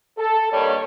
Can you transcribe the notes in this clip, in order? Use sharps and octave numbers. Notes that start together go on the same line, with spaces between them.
A4
G2 D#3 G3 A#3 C#5